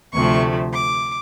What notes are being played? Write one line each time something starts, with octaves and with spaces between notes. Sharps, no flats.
D2 C3 F3 A3 C#6
D6